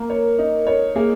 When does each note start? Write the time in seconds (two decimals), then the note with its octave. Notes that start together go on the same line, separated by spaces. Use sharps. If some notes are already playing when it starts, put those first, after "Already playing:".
Already playing: A#3 A#4
0.10 C#5
0.38 D#4
0.67 C#5
0.95 A#3 G#4